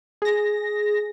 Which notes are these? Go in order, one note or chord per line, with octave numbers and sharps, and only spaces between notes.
G#4 A#6